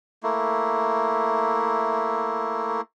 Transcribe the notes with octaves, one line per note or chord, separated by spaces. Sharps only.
A3 A#3 E4